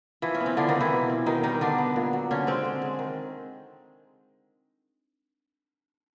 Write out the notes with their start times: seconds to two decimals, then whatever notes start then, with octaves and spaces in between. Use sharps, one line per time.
0.22 E3 F3 E4
0.35 C#4
0.40 B3
0.46 C4
0.57 D3 F3 D4
0.69 D#3 D#4
0.75 G#3
0.81 E3 E4
0.92 B2
1.10 C4
1.26 B2 D#3 D#4
1.43 D#3 G3 D#4
1.61 D3 B3 D4
1.78 B3
1.96 A#2
2.13 F#3
2.31 D3 C#4
2.47 G#3 C4
2.65 D3
2.82 G#3
2.99 D#3